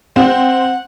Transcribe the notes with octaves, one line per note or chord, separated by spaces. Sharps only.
C4 F#5